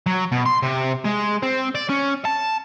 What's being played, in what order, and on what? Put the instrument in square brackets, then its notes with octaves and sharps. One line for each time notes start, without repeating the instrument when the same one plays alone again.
[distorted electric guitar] F#3
B2
C6
C3
G#3
C4
D5
C#4
A5